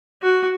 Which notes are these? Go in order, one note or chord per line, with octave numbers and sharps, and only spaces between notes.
F#4